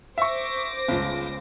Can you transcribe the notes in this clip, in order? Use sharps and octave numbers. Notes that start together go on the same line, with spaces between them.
C5 E5 C#6 D6 A#6
G1 C#2 C#3